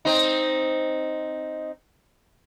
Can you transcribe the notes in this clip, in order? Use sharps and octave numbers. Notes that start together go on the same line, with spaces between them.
C4 D#4